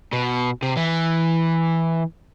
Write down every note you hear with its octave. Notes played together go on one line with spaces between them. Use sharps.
B2
C3
E3